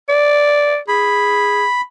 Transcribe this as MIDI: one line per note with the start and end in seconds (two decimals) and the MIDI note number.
0.09 0.78 74
0.88 1.66 68
0.88 1.81 83